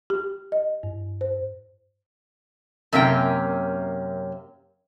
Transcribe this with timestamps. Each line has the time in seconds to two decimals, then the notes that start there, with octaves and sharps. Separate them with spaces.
0.10 G4
0.52 D#5
0.83 G2
1.21 C5
2.93 F#2 C3 A#3 C#4 F#4 G5